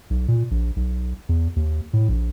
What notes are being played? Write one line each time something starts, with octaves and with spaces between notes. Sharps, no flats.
B1
A#2
A#1
B1
E2
D#2
A2
A#1